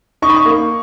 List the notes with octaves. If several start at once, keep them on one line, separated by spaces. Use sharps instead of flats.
D#4 C#6
B5
C#6
A#3